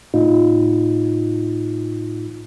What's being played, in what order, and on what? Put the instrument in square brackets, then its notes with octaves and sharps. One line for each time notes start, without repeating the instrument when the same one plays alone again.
[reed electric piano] A2 D#4 F4